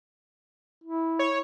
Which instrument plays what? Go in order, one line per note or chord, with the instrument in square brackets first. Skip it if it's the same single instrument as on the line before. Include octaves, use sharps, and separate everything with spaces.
[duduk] E4
[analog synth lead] C#5